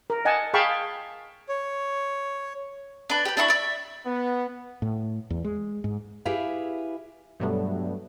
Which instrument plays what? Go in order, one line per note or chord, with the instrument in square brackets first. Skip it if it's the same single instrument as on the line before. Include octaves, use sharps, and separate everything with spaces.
[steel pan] A#4
D#5 F#5 G#5 A5
G#4 F5 G5 A5 B5 C#6
[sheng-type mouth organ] C#5
[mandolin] D4 B4
G4 B4
D4 E4 B5 C#6
D5 E5
[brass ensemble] B3
[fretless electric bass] A2
E2
G#3
G#2
[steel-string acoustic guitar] E4 G4 G#4 B4 E5 F5
[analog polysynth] G2 B2 F#3 G3 A3 B3